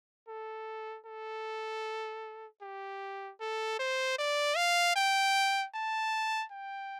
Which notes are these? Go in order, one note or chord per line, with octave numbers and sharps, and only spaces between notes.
A4
A4
G4
A4
C5
D5
F5
G5
A5
G5